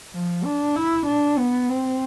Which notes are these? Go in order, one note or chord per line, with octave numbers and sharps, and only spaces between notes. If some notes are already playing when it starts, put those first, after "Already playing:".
F3
D4
E4
D4
B3
C4